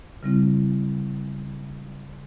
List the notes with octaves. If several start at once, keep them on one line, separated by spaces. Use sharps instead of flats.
C#3 G3 C4 E4